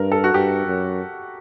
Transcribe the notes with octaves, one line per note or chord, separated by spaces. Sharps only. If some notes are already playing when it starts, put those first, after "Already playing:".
Already playing: G2 A#4
A4
F#4
G2 G4
F#2